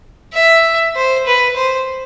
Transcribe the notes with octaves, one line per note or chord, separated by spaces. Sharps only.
E5
C5
B4
C5